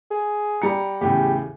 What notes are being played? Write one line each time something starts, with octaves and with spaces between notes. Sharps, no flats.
G#4
G3 A#5 C#7
E2 A2 C#3 G4